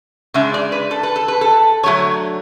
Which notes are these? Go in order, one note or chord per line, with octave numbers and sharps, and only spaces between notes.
C#3 G#3 D4 E5
D5
B4
A4
B4
A4
B4
A4
D3 F#3 A3 C#5